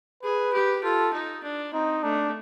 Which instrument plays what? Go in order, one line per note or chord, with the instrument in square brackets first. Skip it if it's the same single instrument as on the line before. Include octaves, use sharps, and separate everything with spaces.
[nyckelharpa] G#4 [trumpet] B4
[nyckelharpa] G4
[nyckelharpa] F4 [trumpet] A4
[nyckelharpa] D#4
D4
[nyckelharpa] C4 [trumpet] D#4
[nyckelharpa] A3 [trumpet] D4